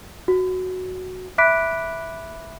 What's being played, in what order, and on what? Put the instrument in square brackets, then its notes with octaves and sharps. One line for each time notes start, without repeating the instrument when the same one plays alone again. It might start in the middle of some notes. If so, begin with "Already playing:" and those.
[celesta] F#4
E5 B5 D6 F#6 B6 D7